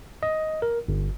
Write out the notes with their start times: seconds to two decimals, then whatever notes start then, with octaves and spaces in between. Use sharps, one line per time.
0.23 D#5
0.62 A#4
0.88 G1